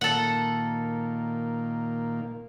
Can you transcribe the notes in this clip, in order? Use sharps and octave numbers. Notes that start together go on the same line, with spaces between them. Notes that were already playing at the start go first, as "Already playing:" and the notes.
A#2 D#3 A#3 A4 F#5